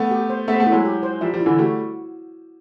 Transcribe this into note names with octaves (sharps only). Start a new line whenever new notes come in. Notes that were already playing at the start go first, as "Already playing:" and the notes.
Already playing: A3 B3
G4
C5
A3 B3 E5
C4
A3 B3
E4
F#3 G#3
G4
C5
F3 G3 E5
F3 G3
E4
D3 E3
G3 A3 F#4